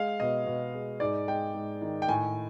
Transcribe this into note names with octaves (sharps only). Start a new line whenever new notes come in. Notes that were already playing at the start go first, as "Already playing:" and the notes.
Already playing: G#3 F5
B2 D#5
B2
G#3
G#2 D5
G#3 G5
G#2
D#3
G5
A2 G#5